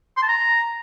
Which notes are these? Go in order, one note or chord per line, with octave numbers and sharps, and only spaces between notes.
C6
A5
A#5